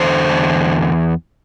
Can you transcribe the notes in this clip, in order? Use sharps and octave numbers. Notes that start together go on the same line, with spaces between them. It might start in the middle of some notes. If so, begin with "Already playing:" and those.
Already playing: E2 D3 C5
E2